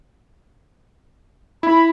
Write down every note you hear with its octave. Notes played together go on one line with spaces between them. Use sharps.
E4 B5